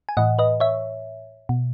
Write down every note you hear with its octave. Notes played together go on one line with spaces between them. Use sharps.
G#5
A2 E3 D#5 F#5
B4 D#5
C#5 E5
B2